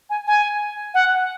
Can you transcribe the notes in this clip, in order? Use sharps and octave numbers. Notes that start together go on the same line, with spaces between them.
G#5
G#5
F#5